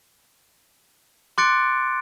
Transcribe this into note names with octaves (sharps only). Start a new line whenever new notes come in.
C6 D6 F#6 A6 C#7 D7